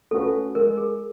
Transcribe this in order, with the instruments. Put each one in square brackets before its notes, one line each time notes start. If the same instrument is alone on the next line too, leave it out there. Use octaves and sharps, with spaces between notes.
[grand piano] A3 C#4 F#4 B4 [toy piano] A4
[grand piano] G#3 [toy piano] A#4
[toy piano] G#4